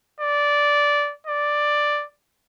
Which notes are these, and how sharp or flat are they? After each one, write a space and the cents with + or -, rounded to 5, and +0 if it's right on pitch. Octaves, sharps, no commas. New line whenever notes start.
D5 -10
D5 +5